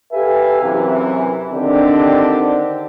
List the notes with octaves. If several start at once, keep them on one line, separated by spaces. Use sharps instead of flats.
G4 A4 B4 E5 F5 G#5
F#2 C3 E3
D3 D#3 C4 D4 G4